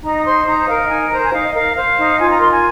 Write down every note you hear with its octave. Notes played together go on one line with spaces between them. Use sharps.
D#4 A#5
D#6
C5 C6
D#4 A#5
A#4 F5
D#4 G#5
C5 A#5
G#5
D#4 F5
D#5
A#4 F5
C5 F5
D#4
F4 G#5
A#5
A#4 C6
G#5